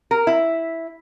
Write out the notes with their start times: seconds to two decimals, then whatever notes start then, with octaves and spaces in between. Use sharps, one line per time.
0.11 A#4
0.27 E4